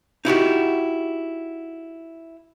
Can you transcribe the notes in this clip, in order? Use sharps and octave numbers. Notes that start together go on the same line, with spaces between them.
D#4 E4 F#4 G4